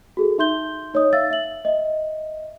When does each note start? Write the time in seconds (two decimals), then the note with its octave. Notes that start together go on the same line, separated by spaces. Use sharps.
0.17 F#4 G#4 A4
0.38 D#4 E5 C6 G6 G7
0.94 D#4 C#5 D#5 D#6
1.13 E5 F5 E6 A6
1.31 E5 F#7
1.65 D#5 E5